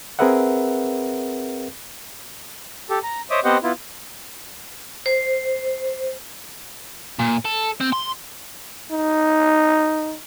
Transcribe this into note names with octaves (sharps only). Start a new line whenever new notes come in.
C4 G#4 A#4 B4 E5 F#5
G4 A4
A#5
C5 C#5 D#5 E5 D6 D#6
B3 C4 G4 C5 D#5 F#5
B3 E4 F4
C5
A#2
A4
C4
C6
D#4